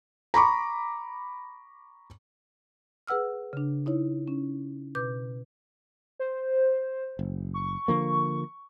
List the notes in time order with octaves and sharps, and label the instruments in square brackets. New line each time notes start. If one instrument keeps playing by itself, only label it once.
[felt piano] A#5 B5 C#6 D6
[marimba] G#4 B4 F#5 E6 F6
C#3 D4
D#4 E4 C#5
C#4
B2 B4 D6 G6
[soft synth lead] C5
[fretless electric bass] F#1
[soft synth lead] C#6
[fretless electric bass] D3 F3 A#3